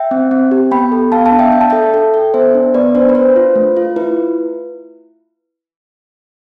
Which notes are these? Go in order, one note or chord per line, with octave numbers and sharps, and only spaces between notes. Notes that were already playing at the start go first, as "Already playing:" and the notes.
Already playing: E5 G5
C4
C4
G4
B3 G5 B5
A4
B3 F5 A5
F5 A5
D4
E5 G5
D4 G5
A5
A4 E5 G5
A4
A4
B3 C5 E5
D4
B3 B4 D5
D4 C5
B4
D4 C5
F4
A3
F4
E4 B4